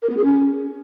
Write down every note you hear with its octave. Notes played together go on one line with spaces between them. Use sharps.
A#4
B3
G#4
C#4